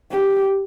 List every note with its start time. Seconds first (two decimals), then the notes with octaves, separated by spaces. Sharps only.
0.12 G4